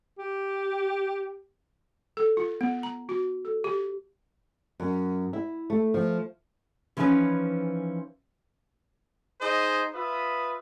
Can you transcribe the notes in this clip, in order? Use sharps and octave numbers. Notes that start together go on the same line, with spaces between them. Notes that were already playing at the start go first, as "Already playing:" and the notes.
G4
A4
F4
B3
A#5
F#4
A4
G4
F#2
E4
A3
F3
E3 F3 C#4 D#4 B4 C#5
D#4 G#4 C5 D#5
F4 B4 E5 D#6